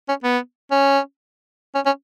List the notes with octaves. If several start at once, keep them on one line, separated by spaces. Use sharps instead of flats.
C#4
B3
C#4
C#4
C#4